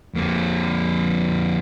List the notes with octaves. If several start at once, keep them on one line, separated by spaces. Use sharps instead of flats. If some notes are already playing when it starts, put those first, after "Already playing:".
F2 A#3